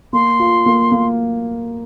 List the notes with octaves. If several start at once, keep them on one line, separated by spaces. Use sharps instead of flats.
A#3 C6
F4
A#3
A#3